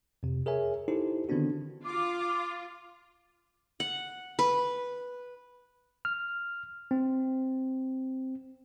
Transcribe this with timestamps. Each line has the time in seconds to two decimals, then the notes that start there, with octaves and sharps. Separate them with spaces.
0.23 F2 C3
0.46 G#4 A#4 C#5 E5 G#5
0.88 D#4 E4 G4 A4 C5
1.29 D3 D#3 B3 C4 D4 F#4
1.85 F4 D6
3.80 F#5
4.39 B4
6.05 F6
6.91 C4